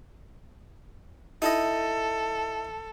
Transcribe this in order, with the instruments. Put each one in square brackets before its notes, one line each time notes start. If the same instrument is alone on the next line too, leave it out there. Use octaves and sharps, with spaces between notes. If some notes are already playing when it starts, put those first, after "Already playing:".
[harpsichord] D#4 E4 D#5 [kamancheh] A4